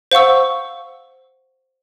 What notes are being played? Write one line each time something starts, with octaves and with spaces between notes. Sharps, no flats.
C5 F5 F#5 C#6 E6